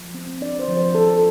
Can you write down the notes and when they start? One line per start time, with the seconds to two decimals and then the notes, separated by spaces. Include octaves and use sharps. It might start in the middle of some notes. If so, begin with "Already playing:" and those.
Already playing: F3
0.14 C4
0.41 D4 D5
0.59 C5
0.68 F3
0.77 C5
0.95 F3 A4